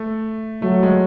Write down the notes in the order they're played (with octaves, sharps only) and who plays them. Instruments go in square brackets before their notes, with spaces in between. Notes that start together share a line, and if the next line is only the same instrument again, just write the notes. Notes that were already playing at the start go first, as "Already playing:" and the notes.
Already playing: [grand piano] A3
[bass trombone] F#3 [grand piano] A3
[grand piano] G#3